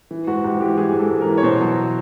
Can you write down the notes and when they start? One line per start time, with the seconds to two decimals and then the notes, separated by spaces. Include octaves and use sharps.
0.11 E3
0.27 G#2 F#4
0.44 G#2 G4
0.60 E3 G4
0.77 E3 G#4
0.94 G#2
0.99 A4
1.10 G#2
1.21 A#4
1.27 E3
1.37 C#5
1.43 B2 C5
1.61 F#3